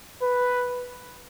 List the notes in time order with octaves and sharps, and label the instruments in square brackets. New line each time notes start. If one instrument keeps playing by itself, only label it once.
[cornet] B4